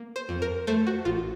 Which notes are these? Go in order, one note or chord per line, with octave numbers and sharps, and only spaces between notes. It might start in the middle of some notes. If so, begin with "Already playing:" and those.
Already playing: A#3
C5
F2
A#4
A3 C5
F#4
A1 F4